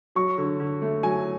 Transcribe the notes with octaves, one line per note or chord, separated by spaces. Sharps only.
F#3 C#6
D3
D3
A3
F#3 G#5